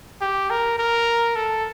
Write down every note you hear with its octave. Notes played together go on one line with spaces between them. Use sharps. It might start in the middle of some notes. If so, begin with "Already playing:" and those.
G4
A#4
A#4
A4